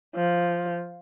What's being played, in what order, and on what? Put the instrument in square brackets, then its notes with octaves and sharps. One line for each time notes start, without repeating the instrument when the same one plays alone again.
[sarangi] F3